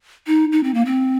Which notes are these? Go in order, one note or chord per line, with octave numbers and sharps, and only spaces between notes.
D#4
D#4
C4
A#3
C4